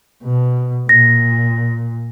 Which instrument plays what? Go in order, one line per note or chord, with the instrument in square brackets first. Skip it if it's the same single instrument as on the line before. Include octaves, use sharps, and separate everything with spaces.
[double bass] B2
[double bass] A#2 [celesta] A#6